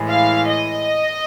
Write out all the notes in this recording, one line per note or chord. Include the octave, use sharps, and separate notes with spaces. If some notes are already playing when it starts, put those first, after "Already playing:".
Already playing: A2 E3 G#3
F5
D#5